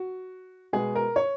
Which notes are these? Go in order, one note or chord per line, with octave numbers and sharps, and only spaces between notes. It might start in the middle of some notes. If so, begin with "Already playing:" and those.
Already playing: F#4
B2 G#3 B3 G#4
A#4
C#5